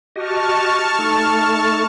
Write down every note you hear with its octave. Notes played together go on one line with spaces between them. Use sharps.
F#4 G4 D#5 A5 C#6 F6
A3 D#4 A4